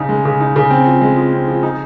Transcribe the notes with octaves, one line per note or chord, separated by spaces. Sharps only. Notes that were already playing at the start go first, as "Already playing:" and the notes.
Already playing: C#3 D#4
G#3
C#3
D#4
C#3
C4
F3
G#3
F3
C4
F3
D#4